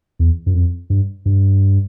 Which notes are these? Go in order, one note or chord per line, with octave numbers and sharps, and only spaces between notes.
E2
F#2
F2
G2
G2